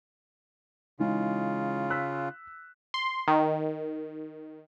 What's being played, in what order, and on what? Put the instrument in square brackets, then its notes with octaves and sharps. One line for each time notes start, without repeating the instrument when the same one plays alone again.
[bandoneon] C#3 F4 [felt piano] E3 G#3 D#4
[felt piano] E6 F#6 B6
[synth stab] C6
D#3